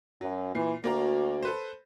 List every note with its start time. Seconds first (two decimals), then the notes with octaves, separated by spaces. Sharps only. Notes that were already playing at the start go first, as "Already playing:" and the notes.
0.21 F#2 F#3
0.55 A#2 E3 C7
0.84 D2 A#3 F#4 D5 A#5
1.43 A4 B4 C5